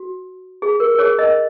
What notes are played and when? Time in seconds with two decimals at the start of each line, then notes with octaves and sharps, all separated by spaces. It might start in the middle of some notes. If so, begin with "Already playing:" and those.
Already playing: F#4
0.62 G#4
0.80 A#4
0.95 A#4
0.99 G#4 C#5
1.18 A#4 D#5